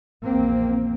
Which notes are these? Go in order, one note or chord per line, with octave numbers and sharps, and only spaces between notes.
A#1 E2 A#3 C4